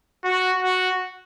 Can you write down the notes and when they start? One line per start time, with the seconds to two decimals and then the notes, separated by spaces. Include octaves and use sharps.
0.24 F#4
0.63 F#4